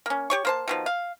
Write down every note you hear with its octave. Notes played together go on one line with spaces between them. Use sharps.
A#3 C#4
G4 C#5 C#6
A#3 C5 A5
B2 D#3 F3
F5